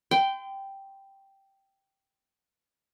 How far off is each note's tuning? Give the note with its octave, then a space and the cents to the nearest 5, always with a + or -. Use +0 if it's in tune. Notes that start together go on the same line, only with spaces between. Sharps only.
G5 -5 C6 -40